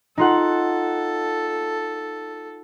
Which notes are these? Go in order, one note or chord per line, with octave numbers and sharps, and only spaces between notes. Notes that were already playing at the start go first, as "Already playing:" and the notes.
D#4 F4 A4 F#5